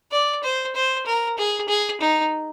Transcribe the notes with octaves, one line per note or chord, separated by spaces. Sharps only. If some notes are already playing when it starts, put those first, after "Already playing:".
D5
C5
C5
A#4
G#4
G#4
D#4